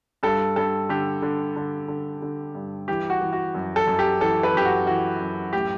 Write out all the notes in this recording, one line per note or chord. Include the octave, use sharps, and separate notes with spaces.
G2 A4
G2 A4
D3 G4
D3
D3
D3
D3
G2
E3 G4
F#4
E3
F#4
F#2
A4
F#2
G4
E3 A4
B4
F#2 G4
F#4
E3 F#4
F#2
A2 G4